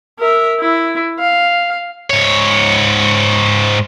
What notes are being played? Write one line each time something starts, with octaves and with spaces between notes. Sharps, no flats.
A#4 E5
E4
F5
G#2 C#5